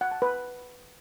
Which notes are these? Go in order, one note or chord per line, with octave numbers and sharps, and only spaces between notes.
F#5
A5
B4